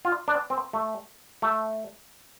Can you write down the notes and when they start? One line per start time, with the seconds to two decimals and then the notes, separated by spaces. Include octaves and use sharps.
0.05 F4
0.28 D4
0.50 C4
0.73 A3
1.42 A3